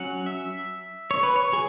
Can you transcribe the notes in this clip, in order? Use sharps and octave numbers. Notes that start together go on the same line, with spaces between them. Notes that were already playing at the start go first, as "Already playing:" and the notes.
Already playing: F#3 C#4 F#5
E5
C#5
B4
C#5
F#3 G#4